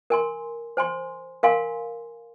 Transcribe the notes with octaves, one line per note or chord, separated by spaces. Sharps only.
A#4 G#5 C6
C5 G#5 C6
A#4 F5 G#5 C6